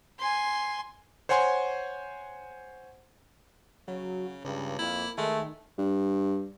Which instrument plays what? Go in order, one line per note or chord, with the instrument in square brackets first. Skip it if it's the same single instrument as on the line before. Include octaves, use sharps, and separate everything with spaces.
[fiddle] G#5 C6
[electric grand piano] C5 C#5 F#5 G#5 C6
[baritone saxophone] C#3 [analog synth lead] F#3
[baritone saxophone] C#2 [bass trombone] G2 [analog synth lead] C#3
[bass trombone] F2 [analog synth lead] A#3 [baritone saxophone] E4
[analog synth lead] D#3 [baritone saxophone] G#3 [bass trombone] A3
[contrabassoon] G2